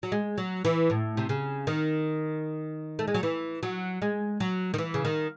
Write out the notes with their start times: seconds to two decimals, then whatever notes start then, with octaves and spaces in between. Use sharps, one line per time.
0.03 F#3
0.12 G#3
0.38 F#3
0.65 E3
0.90 A2
1.17 C3
1.29 C#3
1.67 D#3
2.99 A3
3.07 G#3
3.14 F#3
3.23 E3
3.63 F#3
4.02 G#3
4.40 F#3
4.74 D#3
4.78 E3
4.94 C#3
5.05 D#3